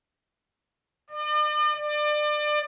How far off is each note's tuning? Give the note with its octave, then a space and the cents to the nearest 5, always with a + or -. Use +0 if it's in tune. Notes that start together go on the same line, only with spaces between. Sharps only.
D5 +45
D5 +30